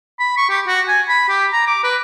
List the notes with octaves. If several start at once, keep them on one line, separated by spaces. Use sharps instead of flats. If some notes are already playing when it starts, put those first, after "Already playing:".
B5
C#6
G4
F#4
G#5
B5
G4
A#5
D6
B4